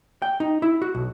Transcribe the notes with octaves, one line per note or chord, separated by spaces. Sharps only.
G5
D#4
E4
F#4
B1